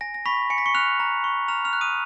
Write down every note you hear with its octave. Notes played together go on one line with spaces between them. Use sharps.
G#5 A#6
A#6
B5 C#6 B6
G#5 C#7
B6
C#6 C#7
F6 F#6 F7
A#5
C#6
A#5 F6 F7
F6 F7
F#6
D#6 D#7